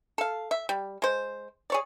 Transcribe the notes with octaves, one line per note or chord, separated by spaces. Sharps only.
A4 F5
E5
G3
G#3 C5
G#4 C#5 D5